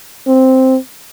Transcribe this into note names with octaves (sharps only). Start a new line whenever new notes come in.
C4